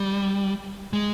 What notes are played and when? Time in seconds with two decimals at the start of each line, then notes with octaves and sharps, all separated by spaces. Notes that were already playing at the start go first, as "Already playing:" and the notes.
Already playing: G3
0.93 G#3